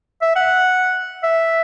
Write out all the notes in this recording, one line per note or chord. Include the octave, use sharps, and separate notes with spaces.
E5
F#5
E5